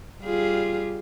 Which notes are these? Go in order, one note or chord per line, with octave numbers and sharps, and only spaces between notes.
G3 F4 G#4